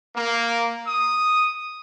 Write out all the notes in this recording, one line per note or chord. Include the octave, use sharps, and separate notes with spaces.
A#3
D#6